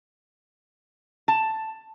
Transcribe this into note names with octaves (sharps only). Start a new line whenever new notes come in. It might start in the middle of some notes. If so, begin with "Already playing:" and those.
A5